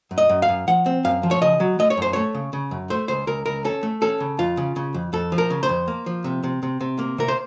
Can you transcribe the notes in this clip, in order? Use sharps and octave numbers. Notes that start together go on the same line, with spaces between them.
F#2
D#5
F#2
F5
F#2
F3 F#5
C4
F#2 F5
F3
C#5
C#3 D#5
F#3
A3 D#5
C#5
F#2 C5
A3 C#5
C#3
C#3
F#2
A3 C5
C#2 C5
C#2 A#4
C#2 A#4
C#4 A4
A3
C#4 A4
C#3
F2 F4
C#3
C#3
F2
F2 A4
F3
A#4
C#3
C5
F2
A#3
F3
C3
C3
C3
C3
A#3
C3 A#4
C5